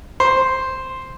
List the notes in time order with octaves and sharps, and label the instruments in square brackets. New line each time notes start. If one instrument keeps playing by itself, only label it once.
[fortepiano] C5